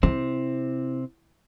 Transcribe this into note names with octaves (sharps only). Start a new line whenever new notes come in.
C3 C4 E4